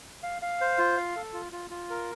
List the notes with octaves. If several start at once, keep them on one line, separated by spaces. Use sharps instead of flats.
F5
F5
C5
F4
F5
A4
F4
F4
F4
A#4